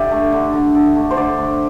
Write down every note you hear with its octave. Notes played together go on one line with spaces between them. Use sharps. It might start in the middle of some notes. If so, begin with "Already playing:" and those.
Already playing: D3 G4 D5 E5
A3
D3
D3
D3
A3
C5
D3 D5
A3